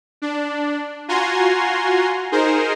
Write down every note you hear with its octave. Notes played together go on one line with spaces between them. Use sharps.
D4
F4 F#4 G#5 A#5 C6
D#4 G#4 A#4 C5